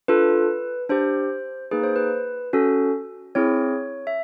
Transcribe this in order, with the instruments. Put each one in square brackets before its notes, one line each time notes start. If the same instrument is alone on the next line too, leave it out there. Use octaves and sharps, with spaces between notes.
[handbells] D4 F4 A4 B4
D4 G4 C5
A#3 D#4 G#4 B4
C5
B4
C#4 F#4 A4
C4 E4 G#4 C#5
E5